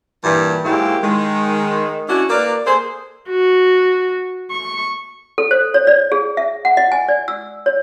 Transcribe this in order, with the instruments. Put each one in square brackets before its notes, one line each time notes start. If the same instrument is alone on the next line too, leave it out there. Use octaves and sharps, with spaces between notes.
[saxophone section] G2 A#2 E3
G#2 F#3 G#3 A#3 E4 G4
D#3 G#3
C#4 D4 E4 F#4
A#3 A#4 B4 D5
A#3 G#4 A4 C5
[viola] F#4
C#6
[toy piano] A4
C5
C#5
D5
G#4
E5
F#5
D#5
G#5
D5
E6
C#5